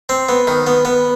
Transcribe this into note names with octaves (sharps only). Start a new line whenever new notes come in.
C4
B3
D#3
B3
B3